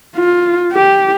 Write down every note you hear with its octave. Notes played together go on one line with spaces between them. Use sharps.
F4
G4